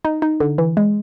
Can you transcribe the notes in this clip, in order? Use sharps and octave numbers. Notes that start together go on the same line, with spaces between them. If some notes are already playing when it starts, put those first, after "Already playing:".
D#4
D#4
D3
E3
G#3